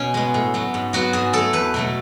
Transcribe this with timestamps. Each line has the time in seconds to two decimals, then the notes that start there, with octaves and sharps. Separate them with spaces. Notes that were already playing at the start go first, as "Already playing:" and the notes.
Already playing: B2 C#4
0.14 G#3 B3
0.34 A2
0.54 F#3 B3
0.74 G#2
0.93 F#3 B3 F#4
1.13 G#2 G#4
1.33 F#3 A3 A4
1.53 E2 B4
1.74 B2 F#3 A3